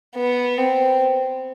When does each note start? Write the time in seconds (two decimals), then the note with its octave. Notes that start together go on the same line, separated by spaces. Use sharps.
0.16 B3
0.58 C4